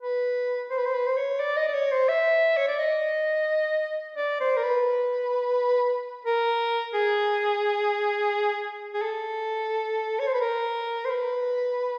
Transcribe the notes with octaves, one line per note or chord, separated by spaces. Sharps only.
B4
C5
B4
C5
B4
C5
C#5
D5
D#5
D5
C#5
C5
E5
C#5
D5
D#5
D5
C5
A#4
B4
A#4
G#4
G#4
A4
C#5
C5
B4
A#4
C5
B4